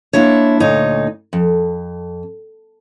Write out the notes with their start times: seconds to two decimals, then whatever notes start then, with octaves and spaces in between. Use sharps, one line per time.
0.13 G#3 A#3 D4 E4 C#5
0.60 D2 A#2 D#4 C#5
1.33 F2